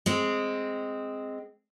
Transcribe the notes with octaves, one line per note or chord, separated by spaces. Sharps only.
G#3 C4